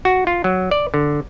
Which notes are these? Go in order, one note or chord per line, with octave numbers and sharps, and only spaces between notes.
F#4
F4
F#3
D5
D3